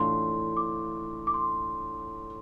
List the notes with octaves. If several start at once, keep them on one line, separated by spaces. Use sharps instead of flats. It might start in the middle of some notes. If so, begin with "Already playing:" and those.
Already playing: A2 E3 A3 D4 F4 C6
D6
D6
C6